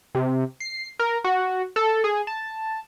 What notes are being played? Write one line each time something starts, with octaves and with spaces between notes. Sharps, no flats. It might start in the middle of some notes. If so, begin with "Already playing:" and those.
C3
C7
A#4
F#4
A4
G#4
A5